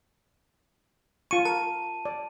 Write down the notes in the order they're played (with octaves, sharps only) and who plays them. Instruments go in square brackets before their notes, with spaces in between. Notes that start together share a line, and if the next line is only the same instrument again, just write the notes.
[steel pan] F4 C#6 [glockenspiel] D#7
[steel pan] A#4 [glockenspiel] A5
[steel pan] D5